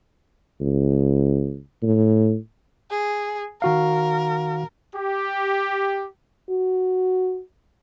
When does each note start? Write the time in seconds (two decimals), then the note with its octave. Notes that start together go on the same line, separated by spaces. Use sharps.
0.61 C#2
1.83 A2
2.91 G#4
3.62 D#3 F#4 A#4 F5
4.95 G4
6.50 F#4